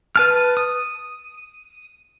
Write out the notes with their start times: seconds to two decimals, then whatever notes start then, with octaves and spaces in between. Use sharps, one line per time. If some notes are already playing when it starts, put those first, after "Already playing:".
0.16 B4 A5 F6
0.57 D#6